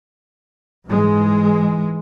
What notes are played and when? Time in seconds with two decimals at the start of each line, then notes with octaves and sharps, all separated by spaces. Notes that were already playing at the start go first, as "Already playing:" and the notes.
0.87 G#2 E3 G#3